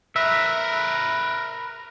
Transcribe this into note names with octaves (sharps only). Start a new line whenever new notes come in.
A#4 B4 E5